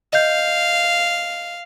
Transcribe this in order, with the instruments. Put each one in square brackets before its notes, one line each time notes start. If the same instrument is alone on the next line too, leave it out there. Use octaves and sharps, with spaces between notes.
[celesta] D#5 G6 [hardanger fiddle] F5